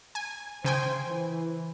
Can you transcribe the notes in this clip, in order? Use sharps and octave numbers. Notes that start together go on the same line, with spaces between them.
G#5
C#3 C5 G5 G#5
E3